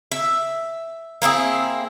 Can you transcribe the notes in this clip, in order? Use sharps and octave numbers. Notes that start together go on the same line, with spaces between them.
E5
A#3 C4 E4 G#4